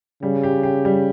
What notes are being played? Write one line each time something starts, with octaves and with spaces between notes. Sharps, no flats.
C#3 G3
G4
G4
G3